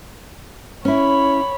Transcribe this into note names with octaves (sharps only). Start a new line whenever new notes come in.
C#4 E4 C#5 B5